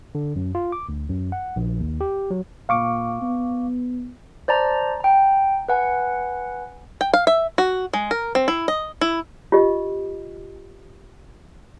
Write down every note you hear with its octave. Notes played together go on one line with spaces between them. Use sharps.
D3
F#2
F4
D6
D2
F#2
F#5
A#1
D#2
G4
F#3
A#2 F5 C#6 D6
B3
C5 D5 A5 A#5
G5 A#5
B4 F#5 G#5
G5
F5
E5
F#4
G#3
A#4
C4
E4
D#5
E4
F4 G4 D#5